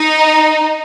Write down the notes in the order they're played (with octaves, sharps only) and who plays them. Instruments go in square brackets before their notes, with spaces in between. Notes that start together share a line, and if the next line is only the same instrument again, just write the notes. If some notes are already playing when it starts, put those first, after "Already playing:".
Already playing: [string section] D#4